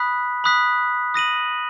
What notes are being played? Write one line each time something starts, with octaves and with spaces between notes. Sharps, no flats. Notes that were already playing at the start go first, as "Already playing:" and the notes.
Already playing: B5 D#6 F#6 B6
B5 D#6 F#6 B6
D#6 A#6 D#7 F#7